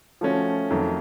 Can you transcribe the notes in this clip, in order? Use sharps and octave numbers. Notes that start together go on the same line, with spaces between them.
F3 A3 C#4 F#4
F2 D#3 F#3 A3